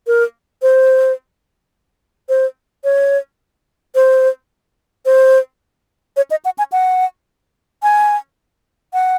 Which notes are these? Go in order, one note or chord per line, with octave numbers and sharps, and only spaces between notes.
A#4
C5
C5
C#5
C5
C5
C#5
D#5
F#5
G#5
F#5
G#5
F#5